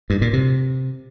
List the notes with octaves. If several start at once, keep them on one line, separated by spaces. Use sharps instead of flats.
G2
A#2
C3